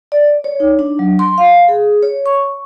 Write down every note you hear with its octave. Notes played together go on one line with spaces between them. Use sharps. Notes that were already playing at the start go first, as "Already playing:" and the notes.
D5
C#5
D#4
D4
F#3
C6
F5
G#4
C#5
C#6